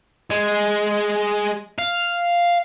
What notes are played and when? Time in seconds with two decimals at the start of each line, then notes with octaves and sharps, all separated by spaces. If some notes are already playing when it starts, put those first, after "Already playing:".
0.31 G#3
1.79 F5